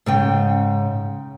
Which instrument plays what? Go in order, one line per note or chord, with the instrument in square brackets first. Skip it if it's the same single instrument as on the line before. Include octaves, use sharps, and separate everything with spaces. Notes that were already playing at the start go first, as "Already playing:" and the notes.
[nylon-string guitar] G#2 C#3 G5